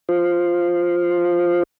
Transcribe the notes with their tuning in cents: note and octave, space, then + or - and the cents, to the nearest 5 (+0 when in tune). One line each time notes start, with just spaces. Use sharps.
F4 +0 C5 +0